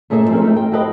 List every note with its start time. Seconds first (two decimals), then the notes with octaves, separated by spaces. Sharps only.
0.10 A#2 A3 C#4 G#4 D5 E5
0.30 F3 C4 C#4 A#4
0.41 A3 D#4
0.56 G5
0.72 F#4 G4 A4 B4 C5 D#5